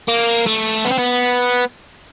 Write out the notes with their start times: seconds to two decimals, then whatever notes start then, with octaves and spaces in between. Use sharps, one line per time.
0.08 A#3
0.46 A3
0.85 B3
0.92 C4
0.99 B3